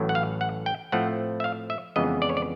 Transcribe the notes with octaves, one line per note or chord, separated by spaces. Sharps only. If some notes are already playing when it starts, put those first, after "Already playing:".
Already playing: A1 A2 F#3 A3
F#5
F5
F#5
G5
A2 F3 A3 C4 F#5
E5
F5
E5
F2 C#3 E3 G#3 B3 D#5
D5
C#5
D5